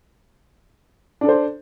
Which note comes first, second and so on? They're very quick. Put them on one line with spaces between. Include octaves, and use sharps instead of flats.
D4 A4 C5